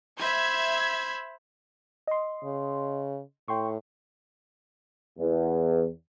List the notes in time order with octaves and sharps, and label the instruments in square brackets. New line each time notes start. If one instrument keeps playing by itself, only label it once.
[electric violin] C5 B5 [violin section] E5 G#6
[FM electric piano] D#5 C6
[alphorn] C#3
[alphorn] A2 [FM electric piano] G5 C6 C#6
[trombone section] E2